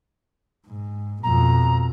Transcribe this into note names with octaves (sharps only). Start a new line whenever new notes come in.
G#2
F2 B2 A#5